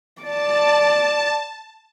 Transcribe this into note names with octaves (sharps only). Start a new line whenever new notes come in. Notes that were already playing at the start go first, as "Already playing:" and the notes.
D5 A5